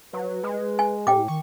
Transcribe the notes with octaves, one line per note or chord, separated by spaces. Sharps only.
F#3 B4
G#3
G#5
A2 G4 G5 D6
D#3 C#6